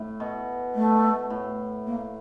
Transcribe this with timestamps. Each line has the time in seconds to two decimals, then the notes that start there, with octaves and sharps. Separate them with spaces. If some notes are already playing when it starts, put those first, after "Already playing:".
Already playing: A2
0.20 B2
0.75 A3
1.30 A2
1.86 A#3